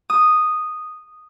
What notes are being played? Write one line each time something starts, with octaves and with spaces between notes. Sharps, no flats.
D#6